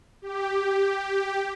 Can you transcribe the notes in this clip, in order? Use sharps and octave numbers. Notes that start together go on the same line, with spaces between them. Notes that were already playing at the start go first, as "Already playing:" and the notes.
G4